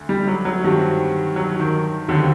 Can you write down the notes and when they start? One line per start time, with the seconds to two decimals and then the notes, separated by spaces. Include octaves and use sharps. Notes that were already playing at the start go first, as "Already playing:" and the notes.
Already playing: D2 D3 A3
0.09 G3
0.28 F#3
0.45 F#3
0.64 G2 D#3 G3 C4 F#4
1.36 F#3
1.60 D#3
2.08 D#2 D3 D#3 F#3 C4